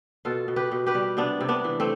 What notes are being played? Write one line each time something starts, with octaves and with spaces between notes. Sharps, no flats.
B2 F4 A4
B2
G4 B4
B2
G4 B4
G3
C3 B3 D4
C3
B3 D4
E3
A3 C4